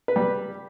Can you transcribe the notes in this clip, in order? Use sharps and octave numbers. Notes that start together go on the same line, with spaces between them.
B4
G3